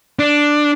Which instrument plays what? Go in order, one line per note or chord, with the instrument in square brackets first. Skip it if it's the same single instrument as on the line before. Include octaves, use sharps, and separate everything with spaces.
[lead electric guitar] D4